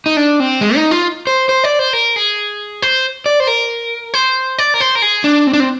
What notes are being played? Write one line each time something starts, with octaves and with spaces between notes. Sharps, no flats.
D#4
D4
C4
G#3
D#4
F4
C5
C5
D5
C5
A#4
G#4
C5
D5
C5
A#4
C5
D5
A#4
C5
A#4
G#4
D4
C4
D4
C4